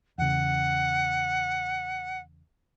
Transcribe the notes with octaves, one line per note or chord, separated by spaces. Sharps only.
E2 C#3 F#5